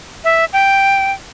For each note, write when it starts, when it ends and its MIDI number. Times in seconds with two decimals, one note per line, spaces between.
0.24 0.45 76
0.53 1.12 79